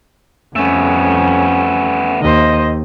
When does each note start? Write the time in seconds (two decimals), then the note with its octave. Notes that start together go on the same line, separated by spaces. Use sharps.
0.56 F2 G3 A3 B3 C#4
2.22 D#2 C5 D#5